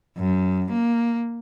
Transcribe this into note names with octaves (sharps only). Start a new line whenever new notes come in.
F#2
A#3